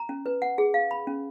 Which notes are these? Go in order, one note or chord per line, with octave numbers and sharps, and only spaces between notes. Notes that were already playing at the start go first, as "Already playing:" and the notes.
Already playing: A#5
C#4
B4
F#5
G#4
F5
B5
C#4